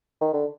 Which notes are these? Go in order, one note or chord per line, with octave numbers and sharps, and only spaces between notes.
D#3
D3